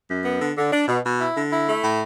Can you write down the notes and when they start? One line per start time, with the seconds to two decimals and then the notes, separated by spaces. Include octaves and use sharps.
0.09 F#2
0.24 B3
0.41 D3
0.57 D3
0.72 D4
0.88 B2
1.04 B2
1.20 E4
1.36 D3
1.52 E4
1.68 A3
1.84 A2